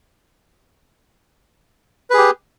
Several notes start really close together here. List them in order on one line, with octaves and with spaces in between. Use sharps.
B4 G#4 G4